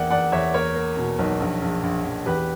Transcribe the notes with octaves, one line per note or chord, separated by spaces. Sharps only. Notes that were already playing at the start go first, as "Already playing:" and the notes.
Already playing: E2 A#3 D5 E5 F#5 G5
E2 D5 F#5
E2 C#5 E5
A#3 A#4 C#5
A#3
B2
B1
A#1
A#1
A#1
A#1
E2 G4 B4